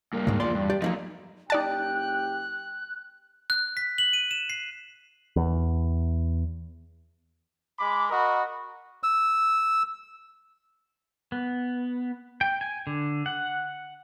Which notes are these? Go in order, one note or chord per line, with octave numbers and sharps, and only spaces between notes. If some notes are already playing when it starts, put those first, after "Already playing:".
G2 A#3
C#2 G#2
E2 A#2 F3 D5 C6
G2
G4 D5
F3 F#3 A3 A#3 D#4
F#1 D#4 G4 D5 G5 A5 F#6
F#6
B6
F#7
D#7
E7
C7
E2
G#3 B5 D6
F#4 A#4 D#5 B5
E6
B3
G5
G#5
D3
F#5